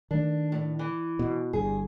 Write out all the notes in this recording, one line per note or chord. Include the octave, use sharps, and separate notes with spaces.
D#3 A3 D4
A2
E3
B2
G1 G2 G#4